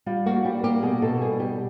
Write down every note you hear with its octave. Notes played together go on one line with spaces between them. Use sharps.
G3 F4
A#3 F#4
G3 G4
A#3 G4
B2 G#4
B2 A4
G3 G#4
G3 G4